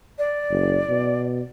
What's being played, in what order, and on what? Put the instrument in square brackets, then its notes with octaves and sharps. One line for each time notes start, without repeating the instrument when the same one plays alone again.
[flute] D5
[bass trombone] F#1
B2